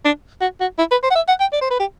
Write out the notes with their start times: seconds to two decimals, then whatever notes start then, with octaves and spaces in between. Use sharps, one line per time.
0.05 D4
0.41 F#4
0.60 F#4
0.78 E4
0.91 B4
1.03 C5
1.10 F#5
1.15 E5
1.28 F#5
1.40 G5
1.52 D5
1.61 C5
1.70 B4
1.80 G4